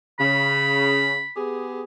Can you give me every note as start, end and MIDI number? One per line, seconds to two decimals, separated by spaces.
0.20 1.24 49
0.20 1.40 83
1.36 1.83 59
1.36 1.83 67
1.36 1.83 68